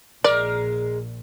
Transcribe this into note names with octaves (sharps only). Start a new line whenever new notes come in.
A#1 A#2 G#3 A#4 D5